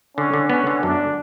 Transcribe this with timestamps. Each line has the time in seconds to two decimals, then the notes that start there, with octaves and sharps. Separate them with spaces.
0.17 D3 C#4
0.34 D3
0.50 B3 C#4
0.67 D3
0.83 F#2 D4